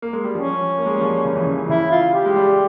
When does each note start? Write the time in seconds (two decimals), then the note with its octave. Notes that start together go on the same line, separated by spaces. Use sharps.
0.02 A#3
0.13 G#3
0.24 G3
0.35 F3 C#4
0.78 A#3
0.86 G#3
0.94 G3
1.01 F3
1.25 C#3
1.35 E3
1.46 C#3
1.69 C#3 E4
1.91 F4
2.13 G4
2.26 G#3
2.36 G3